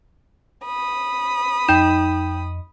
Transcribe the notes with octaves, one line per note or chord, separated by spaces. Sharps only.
B5 D#6
F2 D#4 G5 G6 E7